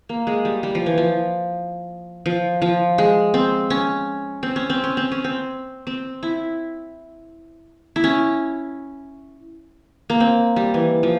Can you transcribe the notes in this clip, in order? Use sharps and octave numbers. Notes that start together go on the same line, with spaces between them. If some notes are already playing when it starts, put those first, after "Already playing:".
A#3
G#3
G3
G3
F3
E3
F3
F3
F3
G#3
C4
C#4
C4
C#4
C4
C#4
C4
C#4
C4
C4
E4
E4
C#4
A#3
C4
G3
E3
F3